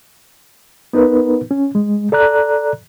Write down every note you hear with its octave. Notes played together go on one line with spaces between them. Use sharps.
B3 D#4 A#4 B4
C#4
G#3
A4 D5 A#5 F#6